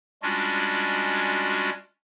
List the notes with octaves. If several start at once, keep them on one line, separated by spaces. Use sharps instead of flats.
G3 G#3 C#4 D4 F4 F#4